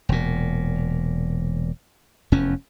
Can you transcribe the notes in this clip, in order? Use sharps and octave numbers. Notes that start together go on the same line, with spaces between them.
E1 A#2
F1 E2 C#4